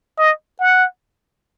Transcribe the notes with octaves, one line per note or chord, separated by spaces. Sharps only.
D#5
F#5